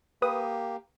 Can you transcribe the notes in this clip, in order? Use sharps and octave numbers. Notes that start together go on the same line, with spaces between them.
A#3 G4 B4 D#6